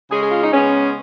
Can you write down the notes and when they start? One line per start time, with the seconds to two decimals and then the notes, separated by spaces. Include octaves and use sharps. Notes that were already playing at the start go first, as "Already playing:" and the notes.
0.09 C#3 G#3 C#4 G#4
0.20 G#4
0.30 F4
0.41 D#4
0.52 C#3 G#3 B3 C#4